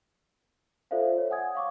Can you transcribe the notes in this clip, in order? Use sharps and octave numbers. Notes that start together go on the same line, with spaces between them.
F4 A4 C5 D5 E5 F5
C#5
F#5 G#5 D#6 G#6
F5 C#6 D6